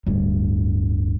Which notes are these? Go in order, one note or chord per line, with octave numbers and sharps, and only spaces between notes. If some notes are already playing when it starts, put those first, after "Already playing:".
D1 G2